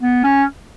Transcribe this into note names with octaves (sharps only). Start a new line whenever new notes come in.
B3
C#4